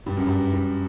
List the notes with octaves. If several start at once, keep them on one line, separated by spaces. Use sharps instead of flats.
G2
F#2
G2
G2